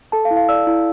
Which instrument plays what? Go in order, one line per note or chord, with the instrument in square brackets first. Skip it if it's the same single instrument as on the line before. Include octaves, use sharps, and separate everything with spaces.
[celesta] A4 A5
F5
E4
F5
D5 E6
E4